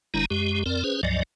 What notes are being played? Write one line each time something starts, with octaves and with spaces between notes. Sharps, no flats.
F#1 D#3 G#3 D4 E4 A#5
F#2 G#3 G4
F2 C4 A#4 D5
C#4 G#4 B4 C5
C#2 G2 F3 F#3 D5 D#5